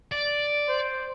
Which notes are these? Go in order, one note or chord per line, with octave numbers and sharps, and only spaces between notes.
D5
C5